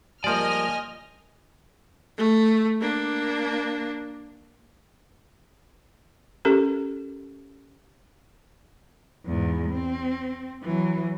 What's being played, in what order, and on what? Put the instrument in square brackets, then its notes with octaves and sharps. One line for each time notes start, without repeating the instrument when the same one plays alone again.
[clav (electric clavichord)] F3 D5 [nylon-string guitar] G3 G#3 A#3 [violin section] D#5 F6 [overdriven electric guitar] G#5
[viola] A3
A#3 D4
[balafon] C#4 G4 A4 A#4
[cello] E2 G#2
C4
E3 F#3